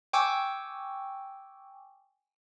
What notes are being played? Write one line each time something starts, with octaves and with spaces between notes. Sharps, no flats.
G5 G#5 C#6 D6 E6